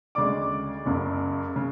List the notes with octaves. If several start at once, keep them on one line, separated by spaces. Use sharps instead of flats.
D2 C#3 G#3 D5 D6
F#1 F#2 C#3
C#3